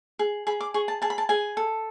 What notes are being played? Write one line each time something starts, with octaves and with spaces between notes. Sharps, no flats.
G#4
G#4 B5
D6
G#4 C#6
A5
G#4 A5
B5
A5
G#4 G#5
A4